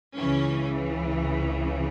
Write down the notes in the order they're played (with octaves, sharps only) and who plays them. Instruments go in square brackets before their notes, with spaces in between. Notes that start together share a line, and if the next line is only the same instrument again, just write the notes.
[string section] C#2 C#3 E3 C#4